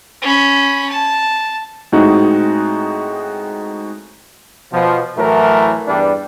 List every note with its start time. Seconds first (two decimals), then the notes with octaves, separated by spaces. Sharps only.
0.22 C#4 B5
0.89 A5
1.92 A2 G#3 C4 D#4 F#4
4.72 B2 F3
5.17 A2 E3 F#3 A3 A#4
5.88 E2 G2 G3 D4